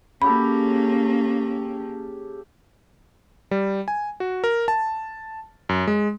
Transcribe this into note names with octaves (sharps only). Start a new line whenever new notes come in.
C#3 A#3 C#4 G4 A4 B5
G3
G#5
F#4
A#4
A5
F#2
G#3